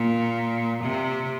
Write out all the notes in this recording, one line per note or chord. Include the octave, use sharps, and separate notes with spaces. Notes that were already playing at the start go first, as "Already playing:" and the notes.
Already playing: A#2
C3